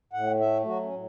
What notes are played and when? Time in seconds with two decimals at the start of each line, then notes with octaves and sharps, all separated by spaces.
0.13 A2 F#5
0.39 A3 E5
0.65 F#3 F#4
0.83 C#4
0.92 A2